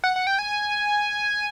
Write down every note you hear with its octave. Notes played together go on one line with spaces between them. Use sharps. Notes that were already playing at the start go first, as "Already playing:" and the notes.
F#5
F#5
G5
G#5